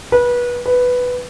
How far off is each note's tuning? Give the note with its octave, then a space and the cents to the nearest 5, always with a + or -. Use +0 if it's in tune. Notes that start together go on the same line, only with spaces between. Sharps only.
B4 -25
B4 +5